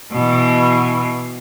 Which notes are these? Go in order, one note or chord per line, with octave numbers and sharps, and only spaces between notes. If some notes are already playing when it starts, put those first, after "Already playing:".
B2 E3